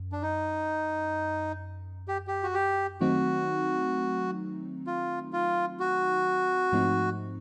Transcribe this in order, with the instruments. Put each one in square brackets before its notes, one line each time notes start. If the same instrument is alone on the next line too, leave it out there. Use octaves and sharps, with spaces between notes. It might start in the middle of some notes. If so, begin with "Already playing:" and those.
Already playing: [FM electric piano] F#2
[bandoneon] D4
D#4
G4
G4
F#4
G4
[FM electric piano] D#3 F#3 A3 C4 D#4 [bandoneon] F#4
[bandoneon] F4
F4
F#4
[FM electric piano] G#2 F3 A3 C4 D#4